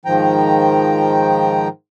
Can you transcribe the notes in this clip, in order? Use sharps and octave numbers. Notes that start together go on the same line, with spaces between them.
G#2 D#3 F3 G5 A#5